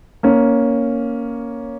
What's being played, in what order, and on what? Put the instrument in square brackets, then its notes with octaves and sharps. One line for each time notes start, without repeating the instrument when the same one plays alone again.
[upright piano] A#3 C#4